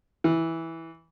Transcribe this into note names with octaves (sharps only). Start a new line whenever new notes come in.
E3